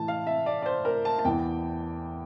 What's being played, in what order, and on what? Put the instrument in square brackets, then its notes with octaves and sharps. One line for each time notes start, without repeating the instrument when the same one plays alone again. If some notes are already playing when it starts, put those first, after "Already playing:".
Already playing: [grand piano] A2 E3 A5
F5
E5
D5
D5
C5
A#4
A5
A5
E2 E3 G5